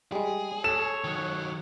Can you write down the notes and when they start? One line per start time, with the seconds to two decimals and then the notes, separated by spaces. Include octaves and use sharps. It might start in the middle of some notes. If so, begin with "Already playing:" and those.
0.12 G3 G#3 G#4
0.64 A4 C#5 E7
1.04 D#3 F#3